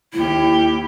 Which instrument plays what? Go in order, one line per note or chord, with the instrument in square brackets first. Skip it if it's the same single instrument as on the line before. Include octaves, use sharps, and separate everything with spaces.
[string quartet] D#2 G4 [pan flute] E4